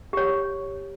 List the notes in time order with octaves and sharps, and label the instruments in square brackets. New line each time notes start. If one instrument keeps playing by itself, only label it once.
[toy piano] G4 C#5